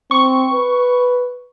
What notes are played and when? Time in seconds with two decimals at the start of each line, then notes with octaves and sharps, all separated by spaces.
0.11 C4 C#6
0.53 B4